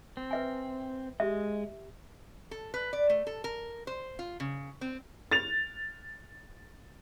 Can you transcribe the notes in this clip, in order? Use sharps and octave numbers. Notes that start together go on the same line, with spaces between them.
C4
B4 E5 G#5
G#3 G4 E5
A4
B4
D5
A3
A4
A#4
C5
F4
C#3
C4
A6 F7